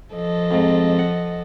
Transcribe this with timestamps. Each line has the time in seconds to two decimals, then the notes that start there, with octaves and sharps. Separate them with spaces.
0.12 F3 A4 D#5
0.51 F2 G#2
0.99 F#5